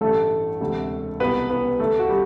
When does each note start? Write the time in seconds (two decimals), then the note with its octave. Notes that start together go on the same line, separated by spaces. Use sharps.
0.01 A1 G2 D3 A3 A4
0.60 E1 D2 C3
1.20 C2 B2 B3 B4
1.50 B3 B4
1.79 D2 D3 A3 A4
1.99 F#4
2.09 G3 G4